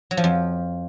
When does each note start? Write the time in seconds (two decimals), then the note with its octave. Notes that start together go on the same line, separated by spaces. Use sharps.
0.11 F#3
0.17 F3
0.24 F2